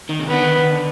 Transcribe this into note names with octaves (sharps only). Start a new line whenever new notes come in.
D#3
C3
D3 B3
D#3
D#3
D3